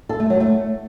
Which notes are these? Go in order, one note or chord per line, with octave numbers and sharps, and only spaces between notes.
A4
A3
F#3
A3